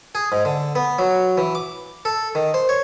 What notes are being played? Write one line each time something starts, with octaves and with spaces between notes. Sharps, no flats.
G#4
G#2
D3
B3
F#3
E3
D6
A4
D#3
C5
C#5